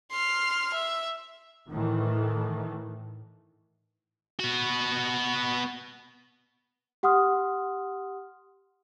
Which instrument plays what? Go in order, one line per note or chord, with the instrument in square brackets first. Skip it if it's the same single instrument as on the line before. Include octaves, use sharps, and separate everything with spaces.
[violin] C6 F6
E5
[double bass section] A2 D#3 E3 A3
[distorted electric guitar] B3 F#4
[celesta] G4 F#5 C6 D#6 F6